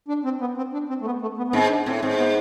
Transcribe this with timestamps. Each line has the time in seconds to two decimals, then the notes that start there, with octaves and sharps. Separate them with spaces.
0.08 D4
0.24 C4
0.40 B3
0.57 C4
0.73 D4
0.89 C4
1.01 A3
1.06 B3
1.22 A3
1.37 B3
1.48 B3
1.53 G#2 C4
1.70 D4
1.86 A2 C4
2.01 G#2 C4
2.18 B3